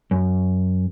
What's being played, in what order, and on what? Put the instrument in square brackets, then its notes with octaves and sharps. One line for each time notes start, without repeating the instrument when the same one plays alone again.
[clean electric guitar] F#2